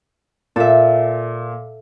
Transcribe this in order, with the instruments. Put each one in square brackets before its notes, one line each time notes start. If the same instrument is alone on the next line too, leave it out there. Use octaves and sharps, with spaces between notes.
[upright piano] A#2 [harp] A4 E5